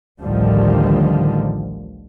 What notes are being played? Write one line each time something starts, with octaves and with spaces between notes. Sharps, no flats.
A1 D2 D3 D#3 F3 G3